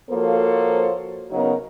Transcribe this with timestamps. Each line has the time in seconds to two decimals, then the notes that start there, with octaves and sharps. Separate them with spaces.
0.11 F3 A#3 F#4 A4 C5 C#5
1.31 C#3 F#3 B3 D#4 F#4 A#4